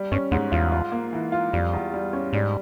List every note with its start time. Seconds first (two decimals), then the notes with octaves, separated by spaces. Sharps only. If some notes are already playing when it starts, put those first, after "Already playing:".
Already playing: G3
0.12 G2 C#4
0.31 E2 G#2
0.52 E2 F4
0.72 F4
0.92 A#3
1.13 E3
1.32 F4
1.53 F2 G3
1.73 E2
1.94 G3
2.13 C#4
2.33 G#2 G3